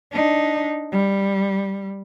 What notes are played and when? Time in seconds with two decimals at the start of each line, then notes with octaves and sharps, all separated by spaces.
0.12 D4 D#4
0.92 G3